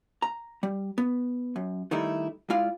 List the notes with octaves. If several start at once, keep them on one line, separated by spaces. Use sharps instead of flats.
A#5
G3
B3
F#2
D#3 G3 A3 D#4 E4
G#3 E4 F4 D5 F5